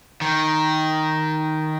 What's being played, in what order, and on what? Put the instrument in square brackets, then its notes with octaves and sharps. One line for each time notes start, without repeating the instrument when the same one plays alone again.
[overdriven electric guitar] D#3